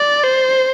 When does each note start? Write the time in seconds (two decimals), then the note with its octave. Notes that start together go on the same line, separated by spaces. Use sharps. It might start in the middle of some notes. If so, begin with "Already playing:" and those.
Already playing: D5
0.24 C5